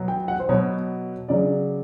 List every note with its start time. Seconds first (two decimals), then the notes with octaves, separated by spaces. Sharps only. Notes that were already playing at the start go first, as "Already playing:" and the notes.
Already playing: B2 F#3 B3
0.08 G5
0.28 F#5
0.40 C5
0.49 B2 F#3 B3 C#5
1.28 C#3 F#3 D5